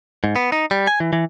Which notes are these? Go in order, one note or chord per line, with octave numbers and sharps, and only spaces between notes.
G#2
B3
D#4
G3
G#5
E3
E3